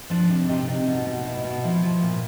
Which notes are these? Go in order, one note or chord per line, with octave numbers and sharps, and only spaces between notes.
F3 D4
C3
C3 D#4
C3
B2
B2
B2 E4
B2 E4
F3 E4
F3
A#2